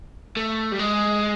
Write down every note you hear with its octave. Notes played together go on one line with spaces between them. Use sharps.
A3
G3
G#3